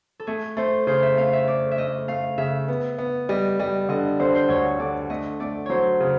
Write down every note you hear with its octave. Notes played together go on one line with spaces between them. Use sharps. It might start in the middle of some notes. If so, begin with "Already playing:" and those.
A4
A3 G#4
A3 C5
C#3 C5
E5
A3 F5
E5
A3 D5
E5
A3 D#5
A3 F5
C#3 E5
B3
B3
G3 D#5
G3 D#5
D3 D#5
D3 C5
C5
D2 C#5
D3 D5
A3 D#5
A3 D5
F#3 C5 C#5
C#3